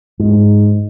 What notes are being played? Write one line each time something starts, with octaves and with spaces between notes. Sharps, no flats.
G#2